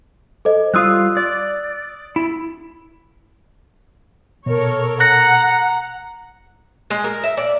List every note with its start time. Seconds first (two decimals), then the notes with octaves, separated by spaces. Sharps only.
0.45 A4 C5 D#5
0.74 G3 F4 F5 D#6 E6 F#6
1.17 D5
2.16 E4
4.46 B2 A4 A#4 C#5
5.00 F#5 A#5 F#6 A#6 C#7
6.90 G#3
7.04 A#4
7.23 E5
7.37 D5